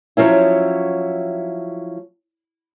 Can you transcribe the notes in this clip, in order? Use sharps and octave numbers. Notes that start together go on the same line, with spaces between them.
F3 F#3 C#4 E4